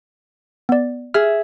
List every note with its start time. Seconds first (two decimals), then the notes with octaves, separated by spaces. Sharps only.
0.69 B3 D5
1.14 G#4 E5 F6